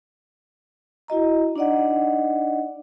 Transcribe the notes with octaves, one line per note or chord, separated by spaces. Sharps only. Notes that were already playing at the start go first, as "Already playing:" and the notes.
E4 F#4 D#5 A#5
D4 D#4 D5 D#5 F#5